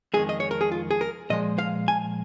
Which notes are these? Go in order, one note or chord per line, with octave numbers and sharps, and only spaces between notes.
F2 D#3 G#3 G#4
D#5
C#5
A#4
G#4
F4
G#4
A#4
A#2 F3 G#3 D#5
F5
G#5